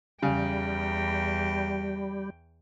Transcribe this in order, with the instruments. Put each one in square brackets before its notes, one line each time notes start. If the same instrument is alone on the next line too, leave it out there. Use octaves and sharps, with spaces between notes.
[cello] E2 G5 [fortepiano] C#3 [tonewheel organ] G3